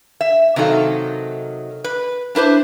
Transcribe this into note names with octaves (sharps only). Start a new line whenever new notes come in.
E5
C3 D#3 F#3 D#4 A4 F5
B4
D4 E4 B4 C5